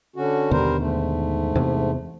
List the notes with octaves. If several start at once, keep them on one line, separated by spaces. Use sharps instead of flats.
D3 C#4 F#4
D#2 B2 D3 G3 A#4 C5
G#2 A3
E2 C3